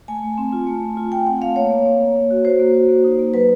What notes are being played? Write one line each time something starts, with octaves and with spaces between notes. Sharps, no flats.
A3 G#5
A3
C4
F4
A3
A3
F4
A3 G5
C4 F#5
A3 F5
A#3 C#5
A#3
A#3
A#3
A#3
F#4
F#4 C5
A#3
F#4
A#3
D#4
A#3
F#3 B4